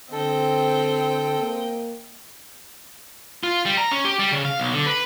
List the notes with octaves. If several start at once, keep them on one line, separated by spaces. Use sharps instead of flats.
D3 C4 A4 D#5 G5
A#3
F4
G3
A#5
C#4
G4
G3
C#3
F5
B1
D3
B4